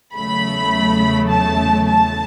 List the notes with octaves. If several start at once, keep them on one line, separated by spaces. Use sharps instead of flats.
E2 C#3 F#3 A3 B5
A5
A5